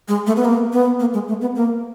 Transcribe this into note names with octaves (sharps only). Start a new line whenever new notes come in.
G#3
A3
B3
A#3
B3
A#3
G#3
A3
B3
A#3